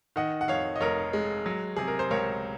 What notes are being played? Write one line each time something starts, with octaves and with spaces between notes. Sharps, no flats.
D#3 D#5 F#5
F#5
F2 C#5 F5
D#5
F1 A#4 C#5
G#3
F#3
C3 G#4
A#4
C5
C#2 A#4 C#5